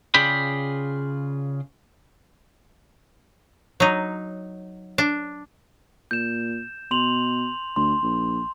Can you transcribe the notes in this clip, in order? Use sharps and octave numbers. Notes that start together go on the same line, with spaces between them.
C#3 F4 G#4 D5 G5 B5
F#3 D#4
D4
A#2 G6 E7
B2 C6 F7 F#7
D2 C6
A#1